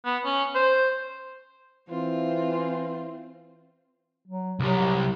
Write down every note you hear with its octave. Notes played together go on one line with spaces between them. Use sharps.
B3
C#4
C5
E3 C4 F4
F#3
C2 F#3 G3